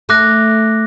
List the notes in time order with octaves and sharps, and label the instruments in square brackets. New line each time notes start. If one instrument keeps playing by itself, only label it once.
[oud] A3 [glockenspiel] D6 F#6 A#6